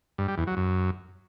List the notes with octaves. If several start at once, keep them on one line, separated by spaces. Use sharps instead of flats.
G2
G3
E2
F#3
F#2